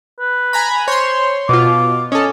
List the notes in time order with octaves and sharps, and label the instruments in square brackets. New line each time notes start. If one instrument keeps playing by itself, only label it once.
[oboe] B4
[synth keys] G#5 A#5 B5
[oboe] C5 [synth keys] C#5 C6
[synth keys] B2 F4 [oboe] D6
[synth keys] C#4 A4 [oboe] D#5